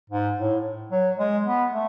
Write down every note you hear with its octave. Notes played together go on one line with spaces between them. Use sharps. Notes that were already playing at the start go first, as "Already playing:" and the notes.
G#2
A2
F#3
G#3
B3
A3